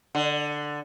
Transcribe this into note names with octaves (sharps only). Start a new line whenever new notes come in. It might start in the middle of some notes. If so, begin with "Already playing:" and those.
D3